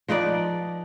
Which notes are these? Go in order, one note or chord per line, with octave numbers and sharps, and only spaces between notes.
F3 D#4 B4 D5